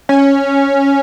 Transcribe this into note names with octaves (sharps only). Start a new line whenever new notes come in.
C#4